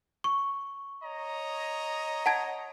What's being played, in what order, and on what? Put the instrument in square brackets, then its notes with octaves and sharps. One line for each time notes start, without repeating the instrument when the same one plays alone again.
[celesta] C#6
[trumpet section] C#5 D#5 A#5
[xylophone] F#5 A5 G#6